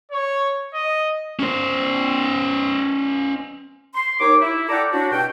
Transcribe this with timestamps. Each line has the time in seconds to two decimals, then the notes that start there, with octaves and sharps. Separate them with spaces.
0.11 C#5
0.74 D#5
1.39 C#4 C5
3.95 C6
4.20 D#2 D#4 C#5 D6
4.41 E4
4.69 A4 D5 F#5 G5 A#5 D6
4.92 C#4 D4 E4 F#4
5.12 G2 B2 C4 G5